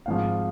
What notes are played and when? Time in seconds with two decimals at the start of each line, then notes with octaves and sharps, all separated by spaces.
0.06 G#1 G#2 F3 F5